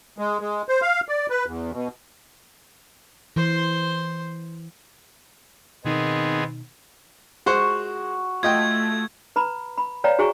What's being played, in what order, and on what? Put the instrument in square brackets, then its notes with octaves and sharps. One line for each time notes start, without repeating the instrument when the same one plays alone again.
[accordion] G#3
G#3
C5
F5
D5
B4
E2
B2
[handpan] E3 [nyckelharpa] C5 C6
[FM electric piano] B2 D#4 [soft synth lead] D#3 [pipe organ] B3 C4 G#4 [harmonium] D#5
[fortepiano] G#3 C5 F#5 [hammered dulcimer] F#4
[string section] A3 [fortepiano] F4 D#5 G5 [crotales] G#6
[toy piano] B4 A#5 B5
B5
B4 C#5 D5 F5 G5 A#5
F#4 G#4 C5 G#5 A#5 C#6